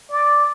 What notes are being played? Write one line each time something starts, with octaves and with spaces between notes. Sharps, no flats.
D5